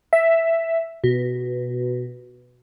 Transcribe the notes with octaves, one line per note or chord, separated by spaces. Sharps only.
E5
B2